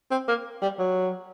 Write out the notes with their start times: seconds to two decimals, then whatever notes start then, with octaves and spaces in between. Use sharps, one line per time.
0.11 C4
0.28 A#3
0.62 G3
0.79 F#3